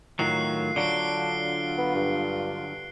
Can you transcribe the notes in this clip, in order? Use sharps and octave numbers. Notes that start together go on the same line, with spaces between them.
A2 D#3 F#3 F4 F#6 C7
D3 F#3 D4 C7 D7 G7
B3
G2